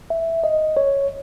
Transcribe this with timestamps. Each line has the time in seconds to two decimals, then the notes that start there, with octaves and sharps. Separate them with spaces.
0.10 E5
0.44 D#5
0.77 C#5